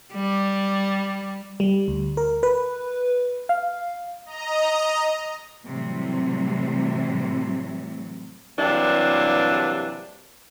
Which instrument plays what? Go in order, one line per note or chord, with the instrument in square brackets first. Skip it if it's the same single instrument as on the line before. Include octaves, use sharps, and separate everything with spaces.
[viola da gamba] G3
[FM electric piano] G3
D2
A#4
B4
F5
[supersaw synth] D#5 A#5
[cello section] A2 C3 E3 F#3 G3 A3
[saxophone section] G2 C3 E3 F#3 A#3 D4